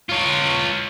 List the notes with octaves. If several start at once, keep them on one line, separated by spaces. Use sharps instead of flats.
F4 C#5